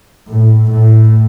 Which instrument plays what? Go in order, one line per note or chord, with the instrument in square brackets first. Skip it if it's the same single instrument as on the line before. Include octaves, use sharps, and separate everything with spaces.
[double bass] A2
A2